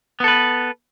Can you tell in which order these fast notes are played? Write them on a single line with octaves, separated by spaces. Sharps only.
B3 A4 B4